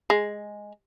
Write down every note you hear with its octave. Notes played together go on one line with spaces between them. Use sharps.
G#3